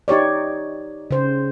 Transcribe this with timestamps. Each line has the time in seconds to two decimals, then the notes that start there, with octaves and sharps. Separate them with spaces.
0.08 D#4 G4 C#5 D5
1.11 C#3 C5